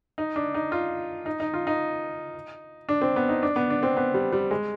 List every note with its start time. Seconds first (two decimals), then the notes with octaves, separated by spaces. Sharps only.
0.18 D#4
0.36 D4
0.54 D#4
0.72 F4
1.26 D#4
1.40 D#4
1.54 F4
1.67 D#4
2.89 D4
3.02 C4
3.16 B3
3.29 D#4
3.43 D4
3.56 B3
3.70 D4
3.83 C4
3.97 B3
4.14 G3
4.32 G3
4.51 G#3